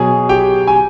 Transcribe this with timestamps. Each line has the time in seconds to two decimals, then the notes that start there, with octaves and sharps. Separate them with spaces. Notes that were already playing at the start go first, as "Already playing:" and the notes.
Already playing: B2 F#3 G#4 G#5
0.29 G4 G5
0.67 G#5